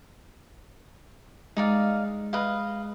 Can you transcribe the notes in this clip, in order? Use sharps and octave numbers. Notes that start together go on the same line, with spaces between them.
G#3 D#4 D5 F5
B4 D#5 F5